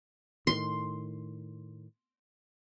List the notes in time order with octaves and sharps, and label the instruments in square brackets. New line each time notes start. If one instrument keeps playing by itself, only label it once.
[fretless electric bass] A2 D#3 [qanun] C6